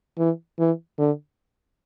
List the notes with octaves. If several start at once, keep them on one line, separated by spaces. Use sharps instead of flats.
E3
E3
D3